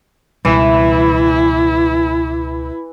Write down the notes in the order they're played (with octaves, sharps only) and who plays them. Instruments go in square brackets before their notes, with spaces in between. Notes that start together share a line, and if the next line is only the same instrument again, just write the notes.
[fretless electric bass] C#2 B2 G3 [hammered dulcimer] E3 [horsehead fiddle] E4